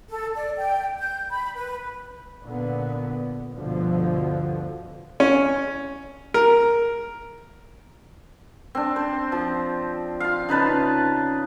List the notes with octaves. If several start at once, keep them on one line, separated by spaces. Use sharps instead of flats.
A4
D5
G5
G6
B5
B4
A#2 D3 B3
D2 G2 B2 D3 F3
C#4
A#4
C4 D4
C5
F3
F4 F5
C#3 D#4 B4 A5